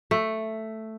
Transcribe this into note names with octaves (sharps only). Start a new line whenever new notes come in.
A3